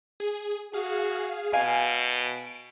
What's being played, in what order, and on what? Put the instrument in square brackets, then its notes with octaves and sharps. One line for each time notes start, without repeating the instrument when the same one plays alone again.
[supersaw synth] G#4
[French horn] F#4 [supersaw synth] G#4 F5
[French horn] B2 [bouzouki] F5 G#5 [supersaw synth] D7